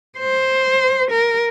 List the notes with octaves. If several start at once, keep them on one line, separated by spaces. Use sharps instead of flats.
C5
A#4